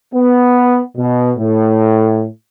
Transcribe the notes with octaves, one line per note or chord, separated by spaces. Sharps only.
B3
B2
A2